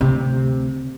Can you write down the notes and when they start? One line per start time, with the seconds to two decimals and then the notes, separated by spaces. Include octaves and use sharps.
0.01 D2 C3